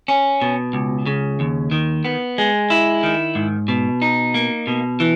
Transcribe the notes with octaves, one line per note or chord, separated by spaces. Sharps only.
C#4
B2
C#2
C#3
D#2
D#3
B3
G#3
E4
D#3
G#2
B2
D#4
A#3
B2
E3